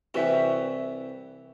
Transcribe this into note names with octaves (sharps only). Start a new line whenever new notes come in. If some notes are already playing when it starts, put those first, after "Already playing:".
C2 E3 F#4 E5 G5